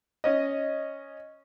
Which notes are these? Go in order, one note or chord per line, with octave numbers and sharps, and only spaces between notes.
C#4 D#5